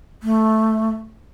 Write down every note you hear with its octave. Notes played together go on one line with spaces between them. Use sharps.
A3